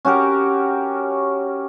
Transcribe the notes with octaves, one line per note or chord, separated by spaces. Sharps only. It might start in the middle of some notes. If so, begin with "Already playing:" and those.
C#4 F#4 G4 A#4